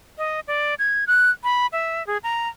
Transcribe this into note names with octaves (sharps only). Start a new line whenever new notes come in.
D#5
D5
G#6
F#6
B5
E5
G#4
A#5